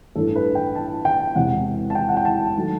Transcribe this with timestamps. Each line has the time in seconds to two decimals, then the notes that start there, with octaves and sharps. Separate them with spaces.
0.15 A1 G2 E3 A3 A4
0.36 B4
0.55 G5
0.75 A5
1.05 G5
1.35 E1 E2 C3 E3 F#5
1.90 A5
1.95 G5
2.09 F#5
2.17 G5
2.25 A5
2.56 D#3 F#3 A3